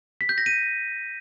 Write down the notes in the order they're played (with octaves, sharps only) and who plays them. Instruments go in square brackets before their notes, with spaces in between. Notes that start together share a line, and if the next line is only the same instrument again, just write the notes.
[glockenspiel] B6
G6
A#6
D#7